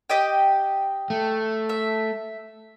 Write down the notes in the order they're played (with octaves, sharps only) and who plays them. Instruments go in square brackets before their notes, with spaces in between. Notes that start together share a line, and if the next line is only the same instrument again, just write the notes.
[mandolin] G4 D#5 G5
[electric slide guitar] A3
[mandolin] E5